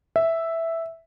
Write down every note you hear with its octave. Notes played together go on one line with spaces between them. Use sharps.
E5